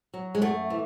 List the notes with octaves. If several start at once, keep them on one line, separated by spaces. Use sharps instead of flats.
F#3
G#3
F#2 A3
E3